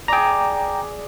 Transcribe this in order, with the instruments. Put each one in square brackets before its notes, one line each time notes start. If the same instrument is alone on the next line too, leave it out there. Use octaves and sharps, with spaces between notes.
[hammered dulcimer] G#4 D5 [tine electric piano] G5 A#5